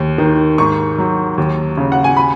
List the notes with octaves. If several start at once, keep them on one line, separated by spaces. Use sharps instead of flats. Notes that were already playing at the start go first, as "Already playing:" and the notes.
Already playing: D#2
D#3
G#2 C#6
F#3
D#2
C#3
F#5
G#5
B5